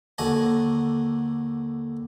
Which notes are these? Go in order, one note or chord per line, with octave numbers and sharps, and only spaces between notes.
D#2 D3 F#4 G#5 A5